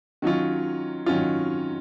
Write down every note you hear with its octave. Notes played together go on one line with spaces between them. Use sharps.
D#3 F#3 C#4 F4
D#3 F#3 C#4 F4